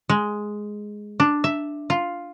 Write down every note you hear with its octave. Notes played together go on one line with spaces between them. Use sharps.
G#3
D4
E5
F4